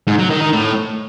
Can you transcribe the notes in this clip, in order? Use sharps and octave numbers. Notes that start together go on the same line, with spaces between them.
G#2
F#3
D#3
D#3
A2